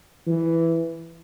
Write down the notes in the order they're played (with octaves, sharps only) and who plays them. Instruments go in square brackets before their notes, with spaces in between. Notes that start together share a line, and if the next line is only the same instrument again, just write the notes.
[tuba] E3